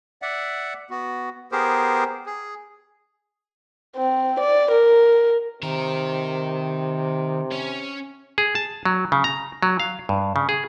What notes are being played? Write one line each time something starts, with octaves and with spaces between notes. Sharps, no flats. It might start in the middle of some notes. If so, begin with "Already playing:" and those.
D5 E5 F#5
B3 F#4
B3 G4 G#4 A#4 C5
G#4
C4
D5
A#4
C3 D#3 A#4
C#4 C#5
G#4
A5
F#3
C#3
A#5
F#3
F5
G2
C#3
G#4